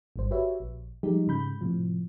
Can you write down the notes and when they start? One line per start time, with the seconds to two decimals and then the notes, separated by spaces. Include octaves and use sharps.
0.16 G#1 G2 C5
0.31 F#4 G4 B4 C#5 E5
0.60 A#1
1.03 F3 G3 G#3 D#4 G4
1.27 G#2 C#3 B5 G6
1.61 A2 C3 F3